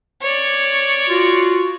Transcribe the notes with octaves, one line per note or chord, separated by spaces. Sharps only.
C#5 D5
F4 F#4